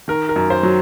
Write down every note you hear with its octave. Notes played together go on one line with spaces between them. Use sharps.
D#3 A#4
A#4
F#2
C5
F#3